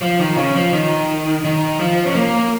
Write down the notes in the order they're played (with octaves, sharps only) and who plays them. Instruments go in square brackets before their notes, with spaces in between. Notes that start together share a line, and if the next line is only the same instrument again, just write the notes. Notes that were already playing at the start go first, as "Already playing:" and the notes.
[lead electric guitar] F3
D#3
C#3
F3
D#3
D#3
F3
C#4
A#3